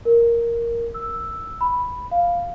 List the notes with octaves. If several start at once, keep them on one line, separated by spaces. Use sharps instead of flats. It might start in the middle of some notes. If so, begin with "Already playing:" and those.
A#4
E6
B5
F5